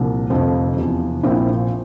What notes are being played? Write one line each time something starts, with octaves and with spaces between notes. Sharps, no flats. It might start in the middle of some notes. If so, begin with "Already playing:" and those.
Already playing: C2 A#2 F3 A#3 D4
F1 F2 D3 F3
E2 C3 F3
A#1 A#2 F3 C4 E4